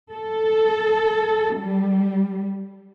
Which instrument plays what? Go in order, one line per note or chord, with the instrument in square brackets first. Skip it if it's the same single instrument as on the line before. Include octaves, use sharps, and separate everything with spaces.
[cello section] A4
G3